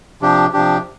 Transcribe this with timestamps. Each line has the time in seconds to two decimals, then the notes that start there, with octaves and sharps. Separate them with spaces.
0.21 C3 F3 D4 G4
0.53 C3 F3 D4 G4